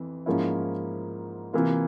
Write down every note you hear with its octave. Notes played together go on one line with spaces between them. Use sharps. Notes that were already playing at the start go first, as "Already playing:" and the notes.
Already playing: F2 E3
G#2 F3 A#3 C#4 E4
C3 E3 A#3 F4